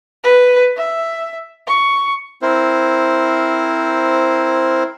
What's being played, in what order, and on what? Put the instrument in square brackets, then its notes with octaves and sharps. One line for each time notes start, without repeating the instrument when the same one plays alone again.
[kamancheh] B4
E5
C#6
[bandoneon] C4 E4 A#4 C5